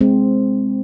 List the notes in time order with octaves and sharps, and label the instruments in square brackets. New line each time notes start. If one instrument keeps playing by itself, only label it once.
[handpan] G#3 C4